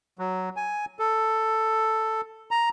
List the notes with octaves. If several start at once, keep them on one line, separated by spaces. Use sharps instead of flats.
F#3
G#5
A4
A#5